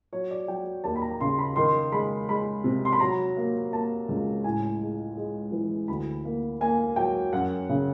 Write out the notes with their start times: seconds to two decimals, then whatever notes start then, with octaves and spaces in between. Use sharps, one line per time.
0.13 F#3 C#5
0.31 D5
0.48 F#3 G5
0.84 D#2 A5
0.96 B5
1.02 A#5
1.21 C#3 C6
1.39 B5
1.56 D#3 C6
1.92 G#3 B5
2.28 G#3 B5
2.64 C3
2.85 C6
2.93 B5
3.00 F#3 A#5
3.37 A#3
3.73 A#3 A5
4.09 C#2
4.44 A2 G#5
4.81 G#3
5.17 G#3
5.52 E3
5.88 D2 B5
6.25 A#3
6.61 A#3 G#5
6.96 F#3 G5
7.33 F#2 F#5
7.69 C#3